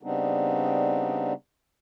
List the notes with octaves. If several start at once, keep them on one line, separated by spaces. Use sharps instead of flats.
C#3 G3 B3 C4 D4 D#4